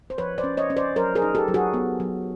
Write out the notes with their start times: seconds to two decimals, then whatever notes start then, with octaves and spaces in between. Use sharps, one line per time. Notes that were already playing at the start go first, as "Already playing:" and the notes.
0.10 C5
0.18 F3 B4 C#5
0.38 C5 D5
0.44 C#4
0.57 C#5 D#5
0.70 C#4
0.77 C5 D5
0.96 F#3 A#4 C5
1.15 G#4 A#4
1.22 D#4
1.35 G4 A4
1.48 F#3
1.54 F#4 G#4
1.74 B3
2.00 F#3